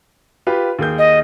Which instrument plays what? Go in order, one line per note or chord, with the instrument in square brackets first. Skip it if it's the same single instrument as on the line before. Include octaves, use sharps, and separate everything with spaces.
[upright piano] F4 G4 B4
D#2 G#4 G6
[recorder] D#5